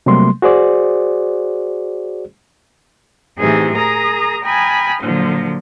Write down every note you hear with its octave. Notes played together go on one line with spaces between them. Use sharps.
C3 F#3 G3 A3 A#3 C6
F#4 G#4 C5 D5
A2 C3 E3 D#4 G#4
G#4 A#4 A#5 D#6
G5 G#5 A#5 B5 D#6 F6
A#2 D3 F3 F#3